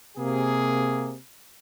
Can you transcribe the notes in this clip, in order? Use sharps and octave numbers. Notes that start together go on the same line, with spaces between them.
C3 A#3 G#4